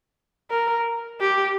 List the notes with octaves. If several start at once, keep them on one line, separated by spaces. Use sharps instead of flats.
A#4
G4